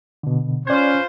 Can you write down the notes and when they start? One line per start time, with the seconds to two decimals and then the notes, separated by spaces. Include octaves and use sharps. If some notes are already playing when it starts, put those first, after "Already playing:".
0.23 B2 D3
0.67 C#4 F4 B4 C5 D5 G#6